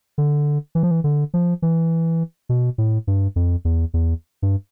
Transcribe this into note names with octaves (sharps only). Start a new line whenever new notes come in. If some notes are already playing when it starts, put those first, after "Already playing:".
D3
E3
F3
E3
D3
F3
E3
B2
A2
G2
F2
E2
E2
G2